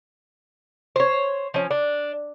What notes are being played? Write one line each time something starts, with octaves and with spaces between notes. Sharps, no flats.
C5 C#5
F3 C#4
D4